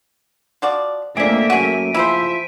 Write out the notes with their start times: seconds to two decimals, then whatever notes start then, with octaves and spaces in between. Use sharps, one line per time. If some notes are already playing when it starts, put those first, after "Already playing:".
0.62 F3 F#4 D5
1.17 F2 A3 A#3 D4 G#4 E5 D7
1.50 F#2 F#4 G#4 B6 D#7
1.95 F3 E4 G#4 C5 E5